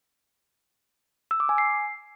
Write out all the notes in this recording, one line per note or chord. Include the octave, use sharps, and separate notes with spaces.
E6
D6
G#5
C7